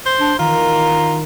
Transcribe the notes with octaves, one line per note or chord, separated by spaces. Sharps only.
C5
D4
D#3 E3 F4 A#5